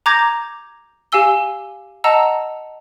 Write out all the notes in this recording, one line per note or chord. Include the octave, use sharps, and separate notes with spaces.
A#5 D6 G6 G#6 A#6
G4 F5 G#5 E6 G7
D#5 F#5 A5 A#5 E6